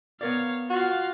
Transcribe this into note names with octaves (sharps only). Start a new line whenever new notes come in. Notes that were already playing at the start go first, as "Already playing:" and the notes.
B3 A#4 C#5 D5 F5
F4 F#4 F5